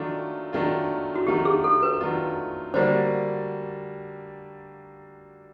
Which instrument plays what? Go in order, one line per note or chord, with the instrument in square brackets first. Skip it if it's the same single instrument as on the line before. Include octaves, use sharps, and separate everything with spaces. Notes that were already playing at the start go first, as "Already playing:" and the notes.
Already playing: [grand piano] D#3 F#3 A3 D4 F4
D#3 F#3 A3 D4 F4
[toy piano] F#4
[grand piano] D#3 F#3 A3 D4 F4 [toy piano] G4
[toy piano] G#4
A4
B4
[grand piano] D#3 F#3 A3 D4 F4
[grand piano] D3 G3 A#3 D4 F#4 [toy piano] C5